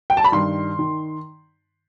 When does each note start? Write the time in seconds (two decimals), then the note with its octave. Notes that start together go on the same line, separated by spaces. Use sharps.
0.10 G5
0.17 A5
0.24 B5
0.32 G2 D#3 C6
0.79 D#3